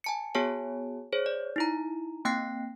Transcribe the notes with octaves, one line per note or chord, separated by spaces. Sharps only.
G#5 A5 C#7
B3 F#4 G#4 C#5 G#5 A5
G#4 C5 C#5
D5
D#4 E4 A#5
A#3 C4 G5 F#6 A#6 C7